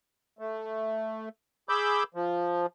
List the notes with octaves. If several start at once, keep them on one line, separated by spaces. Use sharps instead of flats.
A3
G#4 B5 D6 E6 G6
F3